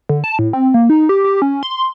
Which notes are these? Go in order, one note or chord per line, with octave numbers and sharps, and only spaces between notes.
D3
A5
A2
C4
A#3
D#4
G4
G4
C#4
C6